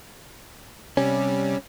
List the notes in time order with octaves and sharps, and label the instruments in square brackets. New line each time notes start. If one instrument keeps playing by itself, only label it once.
[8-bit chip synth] C3 G3 [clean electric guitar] C#4